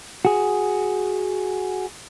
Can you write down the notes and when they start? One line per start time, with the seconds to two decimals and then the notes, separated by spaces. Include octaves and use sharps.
0.25 F#4 G#4